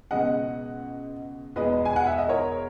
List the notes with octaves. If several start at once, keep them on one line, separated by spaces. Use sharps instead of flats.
C#2 B2 G#3 D#5 F#5
E2 B2 G#3 B4 D#5
G#5
F#5
E5
D#5
A#4 C#5